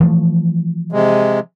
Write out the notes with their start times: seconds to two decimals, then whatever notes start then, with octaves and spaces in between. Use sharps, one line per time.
0.01 E3 F3 A3
0.92 C3 G#3